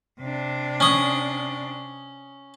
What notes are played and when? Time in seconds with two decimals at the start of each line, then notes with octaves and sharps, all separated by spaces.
0.21 C3 D4
0.80 C#4 D#6